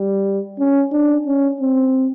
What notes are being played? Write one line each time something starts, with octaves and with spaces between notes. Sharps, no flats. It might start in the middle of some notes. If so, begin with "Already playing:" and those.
Already playing: G3
C#4
D4
C#4
C4